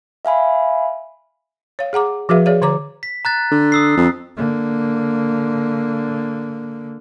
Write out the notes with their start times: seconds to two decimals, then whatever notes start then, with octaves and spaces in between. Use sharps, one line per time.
0.25 E5 F5 G#5 B5
1.79 C#5 F5
1.93 G#4 F#5 A#5 D6
2.29 F3 F#4 G#4 B4 E5 F5
2.46 G#4 C#5 D5 F5
2.62 D3 C#5 A#5 D6
3.03 B6
3.25 A#5 F#6 A6
3.51 D3
3.72 D#6 E6 C7
3.97 F2
4.36 D3 A#3